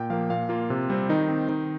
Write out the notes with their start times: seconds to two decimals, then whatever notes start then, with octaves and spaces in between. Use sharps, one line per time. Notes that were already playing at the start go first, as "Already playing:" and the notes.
Already playing: A#2 G5
0.10 F3 A#3 F5
0.30 A#2 F5
0.49 A#3 F4
0.70 C3
0.90 G3 C4
1.09 D#3 D#4
1.29 C4
1.49 D#3